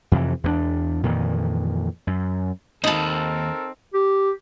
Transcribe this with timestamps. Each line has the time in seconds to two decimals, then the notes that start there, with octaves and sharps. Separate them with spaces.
0.12 F2 C3 D#3 E3
0.44 E2 A#3 D4
1.03 F2 A#2 D#3 E3
2.07 F#2
2.84 D#2 C4 D#4 A4 A#4 A5 B5
3.94 G4